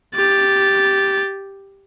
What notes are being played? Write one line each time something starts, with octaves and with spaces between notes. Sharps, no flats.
G4 A6